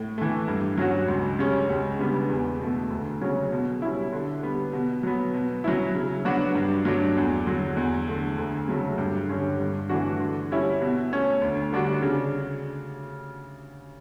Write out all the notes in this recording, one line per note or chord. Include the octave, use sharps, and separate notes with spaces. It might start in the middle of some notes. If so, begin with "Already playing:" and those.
Already playing: A2
E3 A3
G2
F#3 C#4 F#4
C#2
C#3 G3 C#4
C#2
C#3 G3 B3 D4
E2
B2 A3
D2
C#3 F#3 C#4
B2
G3 C#4 E4
D3
G3 B3
B2
F#3 B3
B2
F#3 C#4 E4
C#3
F#3 B3 D4 F#4
G2
F#3 A3 D4
E2
D3 F#3
E2
D3 A3
D2
C#3 F#3 A3
G2
D3 G3 C#4
G2
E3 A3 D4 F#4
D3
G3 C#4 E4
B2
A3 C#4
D2
D3 G3 D4 F#4
C#3